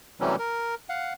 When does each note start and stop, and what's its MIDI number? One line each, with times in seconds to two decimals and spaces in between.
0.21 0.36 48
0.21 0.36 52
0.21 0.36 54
0.21 0.36 55
0.21 0.36 57
0.21 0.36 61
0.39 0.75 70
0.89 1.13 77
0.89 1.13 78